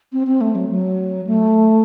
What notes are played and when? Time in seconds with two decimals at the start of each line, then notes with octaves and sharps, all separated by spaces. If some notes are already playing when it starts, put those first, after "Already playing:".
0.13 C4
0.27 C4
0.41 A3
0.55 F#3
0.70 F#3
1.27 A3